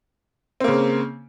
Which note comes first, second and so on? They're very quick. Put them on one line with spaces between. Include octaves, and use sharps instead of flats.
C4 A#3 C#3